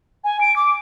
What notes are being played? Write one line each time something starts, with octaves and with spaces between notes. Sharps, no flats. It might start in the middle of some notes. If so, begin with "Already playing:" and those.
G#5
D7
D6